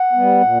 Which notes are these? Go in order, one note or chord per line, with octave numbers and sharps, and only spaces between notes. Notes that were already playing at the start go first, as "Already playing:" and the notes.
Already playing: F#5
G3 B3
A#2